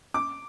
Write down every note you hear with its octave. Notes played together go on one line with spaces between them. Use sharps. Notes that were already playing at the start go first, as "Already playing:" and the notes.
D6